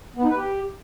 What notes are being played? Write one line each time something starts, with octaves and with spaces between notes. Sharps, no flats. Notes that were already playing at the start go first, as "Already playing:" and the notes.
B3
D#4
B4
G4